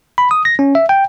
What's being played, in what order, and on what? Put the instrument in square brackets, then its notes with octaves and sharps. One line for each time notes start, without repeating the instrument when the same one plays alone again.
[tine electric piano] B5
D#6
A#6
C#4
E5
G5